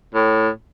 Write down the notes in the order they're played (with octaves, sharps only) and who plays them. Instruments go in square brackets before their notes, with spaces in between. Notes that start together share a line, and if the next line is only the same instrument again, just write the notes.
[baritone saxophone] A2